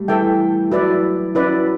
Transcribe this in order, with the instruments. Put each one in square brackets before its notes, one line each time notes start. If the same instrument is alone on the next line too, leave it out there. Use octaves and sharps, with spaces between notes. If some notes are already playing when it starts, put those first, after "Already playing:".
Already playing: [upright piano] G3 A3
[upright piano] E3 [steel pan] A4 E5 G5
[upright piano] F#3 [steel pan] E4 B4 D5
[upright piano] C#4 [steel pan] E4 B4 D5